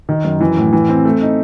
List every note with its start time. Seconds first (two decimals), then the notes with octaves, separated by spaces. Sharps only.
0.09 D#3
0.24 F#2
0.41 E3
0.57 A2
0.73 E3
0.89 C4
1.05 A3
1.21 D#4